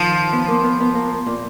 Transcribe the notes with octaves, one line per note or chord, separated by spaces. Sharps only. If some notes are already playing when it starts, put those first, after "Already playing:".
Already playing: D#3 F3
B3
A#3
B3
B3
A#3
A#2